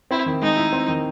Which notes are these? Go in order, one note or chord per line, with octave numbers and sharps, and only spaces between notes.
C4 E4
D#3
G#3 D#4
E4
C4
D#3